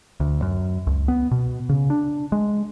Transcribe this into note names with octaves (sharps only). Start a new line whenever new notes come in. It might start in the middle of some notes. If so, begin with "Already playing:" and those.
D2
F#2
C#2
B3
B2
C#3
D4
G#3